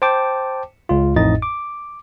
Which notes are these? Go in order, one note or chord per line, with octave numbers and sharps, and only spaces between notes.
C5 G5 A5 D6
C#2 F4
A1 F2 A2 D#4 D#5 A6
D6